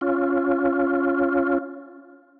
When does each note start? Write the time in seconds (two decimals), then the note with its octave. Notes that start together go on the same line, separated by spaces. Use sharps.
0.01 C#4 F4